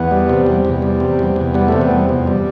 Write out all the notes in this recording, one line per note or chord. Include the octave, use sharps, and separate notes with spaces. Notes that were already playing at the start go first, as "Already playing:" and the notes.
Already playing: E2 B3
G3
C3
E2
E2
G3
C3
E2
E2
G3 B3
C3 A3
B3
E2
F2
G3